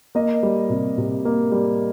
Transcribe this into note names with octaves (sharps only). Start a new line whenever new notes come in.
A#3 D#5
G3
C3
C3
A#3
G3